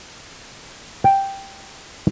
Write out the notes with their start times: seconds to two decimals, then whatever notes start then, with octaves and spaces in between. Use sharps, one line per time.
1.04 G5